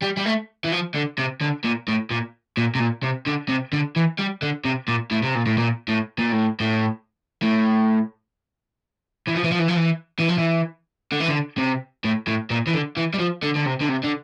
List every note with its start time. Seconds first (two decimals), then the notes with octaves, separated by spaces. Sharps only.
0.02 G3
0.17 G3
0.26 A3
0.65 E3
0.72 F3
0.95 D3
1.18 C3
1.41 D3
1.65 A#2
1.88 A2
2.11 A#2
2.57 A#2
2.75 C3
2.79 A#2
3.03 C3
3.27 D3
3.49 C3
3.73 D3
3.96 E3
4.19 G3
4.42 D3
4.65 C3
4.88 A#2
5.11 A2
5.23 C3
5.35 A#2
5.46 A2
5.58 A#2
5.88 A2
6.18 A#2
6.32 A2
6.60 A2
7.42 A2
9.27 E3
9.35 F3
9.44 E3
9.51 F3
9.59 E3
9.68 F3
9.76 E3
10.19 E3
10.28 F3
10.38 E3
11.12 D3
11.20 E3
11.28 D3
11.58 C3
12.05 A2
12.27 A2
12.51 A#2
12.67 E3
12.74 D3
12.97 E3
13.14 G3
13.19 F3
13.43 D3
13.56 D3
13.66 C3
13.81 D3
13.89 C3
14.04 D3